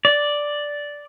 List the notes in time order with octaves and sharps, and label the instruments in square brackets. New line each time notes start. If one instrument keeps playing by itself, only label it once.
[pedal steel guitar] D5